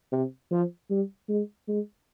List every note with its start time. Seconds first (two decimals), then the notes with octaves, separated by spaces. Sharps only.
0.12 C3
0.51 F3
0.90 G3
1.29 G#3
1.68 G#3